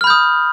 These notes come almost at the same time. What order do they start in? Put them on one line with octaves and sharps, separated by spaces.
F6 B5 G6 D#6